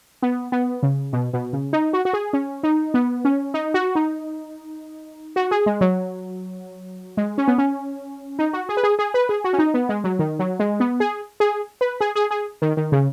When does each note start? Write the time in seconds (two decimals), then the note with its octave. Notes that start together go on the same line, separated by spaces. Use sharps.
0.22 B3
0.52 B3
0.83 C#3
1.13 B2
1.33 B2
1.53 C#3
1.73 D#4
1.93 F#4
2.05 F#4
2.13 G#4
2.33 C#4
2.63 D#4
2.94 B3
3.25 C#4
3.54 D#4
3.74 F#4
3.95 D#4
5.36 F#4
5.51 G#4
5.66 G#3
5.81 F#3
7.17 G#3
7.38 C#4
7.48 B3
7.58 C#4
8.39 D#4
8.53 F#4
8.69 G#4
8.77 B4
8.83 G#4
8.99 G#4
9.14 B4
9.29 G#4
9.44 F#4
9.53 C#4
9.59 D#4
9.74 B3
9.89 G#3
10.04 F#3
10.19 D#3
10.39 F#3
10.59 G#3
10.80 B3
11.00 G#4
11.40 G#4
11.81 B4
12.01 G#4
12.16 G#4
12.31 G#4
12.62 D#3
12.77 D#3
12.92 C#3